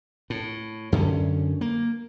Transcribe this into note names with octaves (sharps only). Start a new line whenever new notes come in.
A2
F#2 D3 B3 C#4
A#3